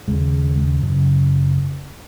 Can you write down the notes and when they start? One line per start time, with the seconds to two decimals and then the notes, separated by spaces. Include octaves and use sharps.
0.08 D#2 C#3 G#3
0.83 F#2 C#3